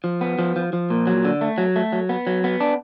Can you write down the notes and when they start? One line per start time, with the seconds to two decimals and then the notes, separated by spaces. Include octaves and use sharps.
0.04 F3
0.21 B3
0.39 F3
0.56 F3
0.73 F3
0.90 A#2
1.07 F#3
1.25 D3
1.41 A3
1.58 F#3
1.76 A3
1.93 F#3
2.09 B3
2.27 F#3
2.44 B3
2.60 D4